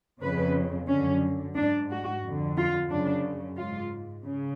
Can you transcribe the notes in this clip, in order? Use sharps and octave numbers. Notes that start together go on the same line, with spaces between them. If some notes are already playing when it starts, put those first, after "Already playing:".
F2 C#3 B4
F#2 D3 C#4
G#2 D4
F#4
F2 D3
F4
F#2 C#3 D4
G#2 F4
C#3